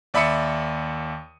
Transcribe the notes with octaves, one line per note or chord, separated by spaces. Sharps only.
D#2 D5 E5 B5 D#6 C#7